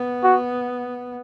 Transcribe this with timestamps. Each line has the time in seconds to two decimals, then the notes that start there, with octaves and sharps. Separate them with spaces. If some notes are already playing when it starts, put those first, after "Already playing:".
Already playing: B3
0.23 F#4